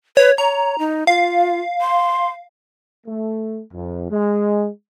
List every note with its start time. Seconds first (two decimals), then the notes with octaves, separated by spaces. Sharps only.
0.17 B4 C#5
0.38 C#5 A#5
0.79 D#4
1.07 F4 F5
1.81 C6
3.07 A3
3.73 F2
4.11 G#3